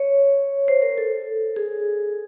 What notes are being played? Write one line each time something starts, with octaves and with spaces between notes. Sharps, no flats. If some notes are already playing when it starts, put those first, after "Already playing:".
Already playing: C#5
C5
A#4
A4
G#4